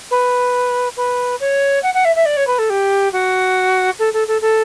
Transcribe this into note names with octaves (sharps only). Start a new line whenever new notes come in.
B4
B4
C#5
F#5
F#5
E5
E5
D5
C#5
B4
A4
G4
F#4
A4
A4
A4
A4